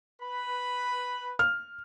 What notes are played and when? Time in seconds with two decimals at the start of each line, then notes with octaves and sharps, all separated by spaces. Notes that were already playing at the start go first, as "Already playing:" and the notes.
0.21 B4 B5
1.39 F6